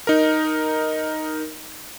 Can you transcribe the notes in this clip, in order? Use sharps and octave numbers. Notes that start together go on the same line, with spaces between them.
D#4 A#4